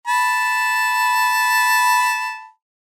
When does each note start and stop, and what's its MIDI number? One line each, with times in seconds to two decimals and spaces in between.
0.07 2.50 81
0.07 2.50 83